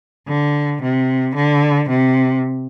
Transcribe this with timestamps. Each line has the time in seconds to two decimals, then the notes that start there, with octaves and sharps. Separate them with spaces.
0.28 D3
0.82 C3
1.35 D3
1.89 C3